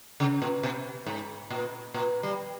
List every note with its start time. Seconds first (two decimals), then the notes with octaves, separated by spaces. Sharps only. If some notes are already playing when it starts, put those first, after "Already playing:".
0.20 C#3
0.42 A#2
0.63 B2
1.06 G#2
1.50 A#2
1.94 A#2
2.23 G3